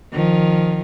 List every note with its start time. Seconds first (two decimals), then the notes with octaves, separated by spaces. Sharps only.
0.13 D#3 F3